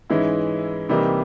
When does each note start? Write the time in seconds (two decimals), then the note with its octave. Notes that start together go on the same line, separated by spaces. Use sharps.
0.10 G#2 E3 G#3 C#4 E4
0.89 C3 E3 G3 A#3 D#4